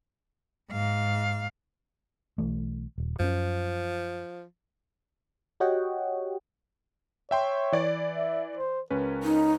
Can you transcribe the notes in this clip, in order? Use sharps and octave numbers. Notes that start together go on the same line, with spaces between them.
G#2 F5
B1 E3 A3
D#1
F#2 F3 C4 C#4
F#4 G4 C#5 D#5 F#5 G5
C#5 E5 G5 C6
E3 D5 G#6
E5
C5
C#2 C#4 A#4 B4
D#4